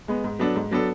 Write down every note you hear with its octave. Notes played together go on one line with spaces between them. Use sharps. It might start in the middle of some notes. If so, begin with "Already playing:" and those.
G#3 B3
G#2
F#3 B3 D4 A4
G#2
F#3 B3 D4 A4